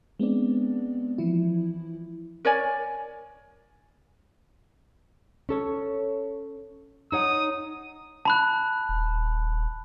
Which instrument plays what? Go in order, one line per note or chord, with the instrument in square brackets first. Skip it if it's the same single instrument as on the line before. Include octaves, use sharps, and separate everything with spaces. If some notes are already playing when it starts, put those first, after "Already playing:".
[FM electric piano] G#3 B3 C4 D4 D5
E3 F3 E4
[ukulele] A#4 C#5 D5 G#5
[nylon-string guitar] C#4 A4 C#5
[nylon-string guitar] D#4 C#5 F#5 [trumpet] D#6
[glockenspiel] A5 B5 F#6
[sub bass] D#1